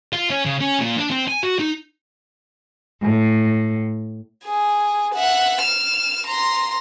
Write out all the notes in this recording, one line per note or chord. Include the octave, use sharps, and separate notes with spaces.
F4
C#4
C#3
C#4
A#2
D4
C4
G#5
F#4
D#4
A2
G#4
E5 F#5
F6 E7
A#5 C6